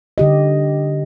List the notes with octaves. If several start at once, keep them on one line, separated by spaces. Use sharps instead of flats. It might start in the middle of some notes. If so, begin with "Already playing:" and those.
D3 G4 D#5